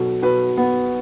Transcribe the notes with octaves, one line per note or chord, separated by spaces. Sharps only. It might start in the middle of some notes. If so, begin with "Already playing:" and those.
Already playing: B2 F#3 A4
B2 B4
B3